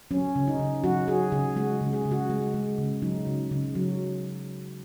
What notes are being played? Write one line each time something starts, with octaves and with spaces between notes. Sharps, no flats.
F#3 C#4
C#3
D#4
C#3
F#3 F#4
F#3 G#4
C#3 G#4
G#3 F#4
C#3
G#4
C#3
F#4
G#3
G#3
C#3
F#3 D#4
C#3
C#3
F#3